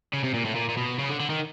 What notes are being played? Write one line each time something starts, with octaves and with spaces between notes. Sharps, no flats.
C#3
C3
A#2
A2
A#2
A#2
B2
C#3
D3
D3
D#3